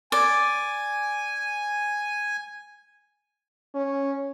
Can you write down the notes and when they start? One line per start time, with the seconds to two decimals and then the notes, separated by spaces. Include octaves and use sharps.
0.12 D5 G#5
3.75 C#4